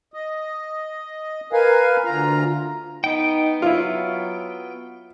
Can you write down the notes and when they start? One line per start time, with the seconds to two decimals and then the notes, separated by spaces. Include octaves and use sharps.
0.14 D#5
1.53 A#4 B4 F5 G#5
2.05 D2 F4 A#5
3.04 B3 D#4 G5
3.62 F#3 E4 F4